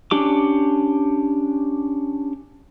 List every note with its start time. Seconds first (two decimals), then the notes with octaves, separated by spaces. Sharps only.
0.11 C#4 D4 G4 D6